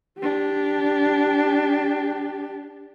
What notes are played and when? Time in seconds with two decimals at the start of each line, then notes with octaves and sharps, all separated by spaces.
0.18 D4 G4